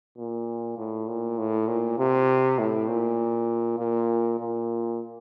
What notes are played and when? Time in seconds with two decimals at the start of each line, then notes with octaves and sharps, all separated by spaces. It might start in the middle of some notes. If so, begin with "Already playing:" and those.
0.18 A#2
0.78 A2
1.08 A#2
1.38 A2
1.68 A#2
1.98 C3
2.59 A2
2.88 A#2
3.78 A#2
4.39 A#2